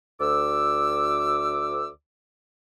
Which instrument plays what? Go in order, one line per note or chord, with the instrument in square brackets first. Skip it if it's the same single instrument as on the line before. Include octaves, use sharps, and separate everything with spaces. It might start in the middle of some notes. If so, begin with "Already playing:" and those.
[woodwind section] D2 D6 E6